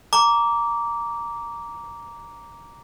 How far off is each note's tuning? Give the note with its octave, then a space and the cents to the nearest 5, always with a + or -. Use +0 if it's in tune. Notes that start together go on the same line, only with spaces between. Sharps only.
A#5 +0 D6 -15